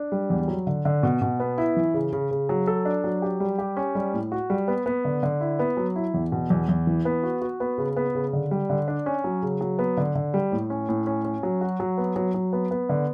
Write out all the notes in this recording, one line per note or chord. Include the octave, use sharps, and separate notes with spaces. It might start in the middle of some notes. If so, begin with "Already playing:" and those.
Already playing: D4
G3
E2
F#3
D3
D3
B2
B2
B3
E4
E3
C#3
C#3
C#3
F#3
A4
D4
F#3
G4
G3
G4
C#4
G3
A2
F#4
G3
B3
B3
D3
D3
E4
B3
F#3
E4
E2
B2
E2
E2
E3
B3
F#4
F#4
B3
C#3
B3
C#3
D3
G3
D3
D4
C#4
F#3
C#3
F#3
B3
D3
D3
G3
A2
C#4
A2
C#4
C#4
F#3
F#4
F#3
B3
F#3
F#3
B3
B3
D3